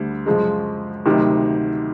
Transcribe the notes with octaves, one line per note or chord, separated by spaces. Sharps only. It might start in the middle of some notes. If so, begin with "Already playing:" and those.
Already playing: D2 D3 G3
F#2 C#3 F3 G#3
D2 C3 D#3 F#3